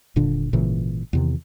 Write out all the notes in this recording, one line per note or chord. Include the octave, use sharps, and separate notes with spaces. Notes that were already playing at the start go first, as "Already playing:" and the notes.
D#1 A#2 D3 D4
G#1 A#2 C#3 E3
E2 C3 D#3